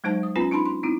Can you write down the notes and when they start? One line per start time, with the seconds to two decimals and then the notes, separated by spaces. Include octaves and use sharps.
0.04 F#3 G#3 D#4 C5 A5
0.23 D#6
0.36 B3 C#4 F4 B4 G#5 A#5
0.51 D4 D#4 A5 B5 C6
0.66 C6
0.83 C4 D#4 E4